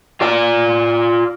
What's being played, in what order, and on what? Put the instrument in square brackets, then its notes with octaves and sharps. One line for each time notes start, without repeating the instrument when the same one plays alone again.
[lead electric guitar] F4 D5